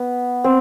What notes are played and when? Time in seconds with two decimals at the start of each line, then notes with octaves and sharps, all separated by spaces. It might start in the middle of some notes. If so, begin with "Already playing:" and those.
Already playing: B3
0.44 C4